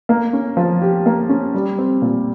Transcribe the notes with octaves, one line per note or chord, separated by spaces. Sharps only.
A#3
C#4
F3
G4
A#3
C#4
G3
C4
A#2